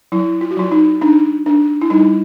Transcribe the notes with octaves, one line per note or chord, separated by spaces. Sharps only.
F#3 E4
F4
F#4
F#3 F4
D#4
D4 D#4
D4
E4
G3 D#4